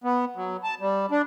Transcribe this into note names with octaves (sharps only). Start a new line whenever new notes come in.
B3
F#3
A5
G3
D4